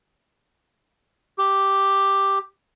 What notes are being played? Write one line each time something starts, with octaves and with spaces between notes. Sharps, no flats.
G4